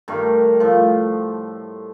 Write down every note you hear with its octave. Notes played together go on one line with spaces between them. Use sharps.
G2 D#3 A3 A#4
A2 F3